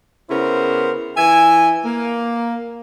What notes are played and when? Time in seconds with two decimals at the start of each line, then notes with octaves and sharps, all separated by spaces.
0.30 C#3 B3 E4 A#4 C5
1.17 E3 E5 G#5
1.85 A#3